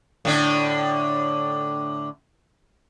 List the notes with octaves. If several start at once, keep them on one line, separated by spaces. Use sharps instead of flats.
A2 D3 D4